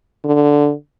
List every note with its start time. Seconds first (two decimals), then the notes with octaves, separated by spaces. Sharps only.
0.25 D3